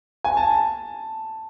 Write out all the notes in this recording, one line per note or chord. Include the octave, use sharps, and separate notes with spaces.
G#5
A5